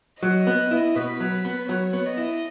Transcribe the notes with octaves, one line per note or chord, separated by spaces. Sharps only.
F#3 D#5
B3
E4
B2 B4
F#3
B3
F#3 C#5
B3
D#5
E4